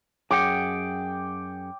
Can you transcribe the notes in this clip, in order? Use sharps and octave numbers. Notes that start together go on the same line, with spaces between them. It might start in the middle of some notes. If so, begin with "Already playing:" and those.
F#2 G#4 F#5 G5 D6